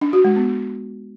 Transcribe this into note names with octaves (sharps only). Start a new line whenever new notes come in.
D4
F#4
G#3
B3